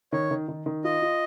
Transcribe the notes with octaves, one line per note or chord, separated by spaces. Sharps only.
D#3 C#5
D#3
D#3
D#3
F4 D#5
F4